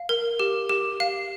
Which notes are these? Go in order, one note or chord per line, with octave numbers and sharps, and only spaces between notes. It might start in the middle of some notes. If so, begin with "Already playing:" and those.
Already playing: F5
A#4
G4
G4
F5